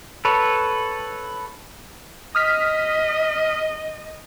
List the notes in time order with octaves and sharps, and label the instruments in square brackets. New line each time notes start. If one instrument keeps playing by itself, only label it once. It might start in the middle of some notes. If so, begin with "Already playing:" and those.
[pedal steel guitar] A4 B4 C#5
[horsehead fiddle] D#5 [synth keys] D#6 F6 B6